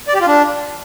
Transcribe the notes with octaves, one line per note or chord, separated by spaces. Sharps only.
D5
G4
F4
D4